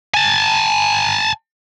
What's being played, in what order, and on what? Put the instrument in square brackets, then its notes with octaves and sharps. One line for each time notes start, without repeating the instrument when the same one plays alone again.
[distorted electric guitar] G#5 A5